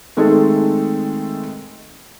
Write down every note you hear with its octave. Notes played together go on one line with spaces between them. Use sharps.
D#3 G#3 A3 C4 G#4 A4